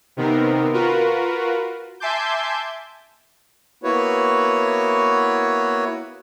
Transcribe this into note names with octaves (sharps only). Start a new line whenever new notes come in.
C3 D#3 B3 C4 A#4
F4 F#4 A#4 B4
E5 G#5 A5 C6 D6 G6
A#3 B3 E4 F#4 B4 C#5